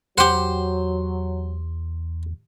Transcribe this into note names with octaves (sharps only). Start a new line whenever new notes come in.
E2 F#3 G4 C5 F#5